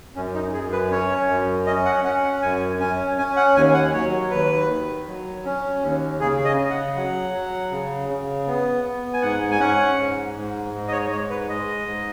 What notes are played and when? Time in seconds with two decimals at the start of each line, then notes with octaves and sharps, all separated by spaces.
0.15 F#2 C#4
0.34 D#4
0.53 F#2 G#4
0.72 B4
0.91 C#4 C#5
1.29 F#2
1.66 C#4 D#5
1.86 F#5
2.04 C#4 F#5
2.24 F#5
2.42 F#2 G#5
2.80 C#4 G#5
3.18 C#4 G#5
3.37 F#5
3.56 D#2 G#5
3.74 F#5
3.93 F#3 C#5
4.31 D#2 B4
4.69 D#3
5.07 F#3
5.45 C#4
5.82 D#2
6.20 C#3 G#4
6.45 D#5
6.58 C#3
6.70 F#5
6.96 F#3 F#5
7.33 F#3
7.71 C#3
8.09 C#3
8.47 B3
8.85 B3
9.14 G#5
9.22 G#2 F#5
9.51 G#5
9.60 C#4 F#5
9.98 G#2
10.36 G#2
10.74 G#2
10.88 D#5
10.92 C#5
11.11 G#2 C#5
11.30 B4
11.49 G#3 D#5
11.87 G#2